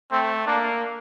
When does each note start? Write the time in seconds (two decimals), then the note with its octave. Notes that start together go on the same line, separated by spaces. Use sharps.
0.11 A3 C4
0.46 A#3 D4